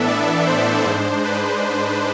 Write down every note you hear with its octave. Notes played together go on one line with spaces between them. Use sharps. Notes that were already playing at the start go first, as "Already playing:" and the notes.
Already playing: A2 E3 B3 D4 A4 E5
D5
C5
G#2 G#3 D4
B4